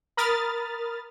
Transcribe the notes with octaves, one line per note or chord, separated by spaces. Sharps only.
A#4 B5 D#6 F6 A6